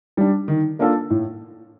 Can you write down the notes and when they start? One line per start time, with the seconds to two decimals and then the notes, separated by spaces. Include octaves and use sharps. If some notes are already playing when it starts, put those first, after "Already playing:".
0.17 G3 D4
0.48 D#3
0.79 A#3 D4 F4 A4
1.10 A2